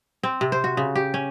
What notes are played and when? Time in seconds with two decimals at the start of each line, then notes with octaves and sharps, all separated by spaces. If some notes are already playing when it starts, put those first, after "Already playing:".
0.23 C4
0.41 C3
0.52 C5
0.64 F#4
0.77 C#3
0.96 G4
1.14 C#4